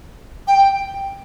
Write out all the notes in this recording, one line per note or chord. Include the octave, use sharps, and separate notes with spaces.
G5